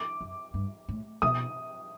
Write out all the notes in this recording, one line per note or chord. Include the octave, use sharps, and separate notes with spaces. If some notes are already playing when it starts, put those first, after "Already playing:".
Already playing: D6
F#2
G2
A2
B2 D#6